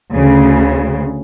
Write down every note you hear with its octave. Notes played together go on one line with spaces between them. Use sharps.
D2 C#3